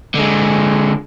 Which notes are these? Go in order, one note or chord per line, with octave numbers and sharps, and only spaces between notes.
D3 G#3